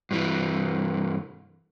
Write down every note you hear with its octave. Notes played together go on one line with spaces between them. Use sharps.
G2 E3